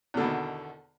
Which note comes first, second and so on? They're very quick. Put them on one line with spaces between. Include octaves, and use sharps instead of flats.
E2 D3 B2 D#3